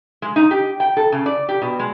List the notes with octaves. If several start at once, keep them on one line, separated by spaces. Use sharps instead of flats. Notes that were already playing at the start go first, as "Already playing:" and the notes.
G#3
D#4
G4
G5
A4
C#3
D5
G4
B2
G#3